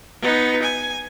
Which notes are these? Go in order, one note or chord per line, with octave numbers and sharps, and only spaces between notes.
B3 D#4
G#5